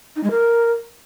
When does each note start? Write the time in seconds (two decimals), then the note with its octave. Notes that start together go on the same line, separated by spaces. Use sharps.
0.16 D#4
0.23 G#3
0.30 A#4